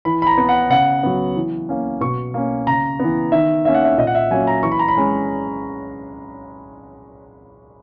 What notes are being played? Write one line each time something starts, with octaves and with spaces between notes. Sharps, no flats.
E3 B5
B5
A#5
B3
F#5
C#3 F#5
F#3 B3
E3
A#3 C#4
B2 C#6
A#3 C#4
C#3 A#5
E3 B3
D#3 E5
A#3 C#4 E5
F#5
E5
A#2 D#5
F#5
E5
F#3 A#3 C#4 G#5
A#5
E3 C#6
B5
A#5
B5
G#3 C#4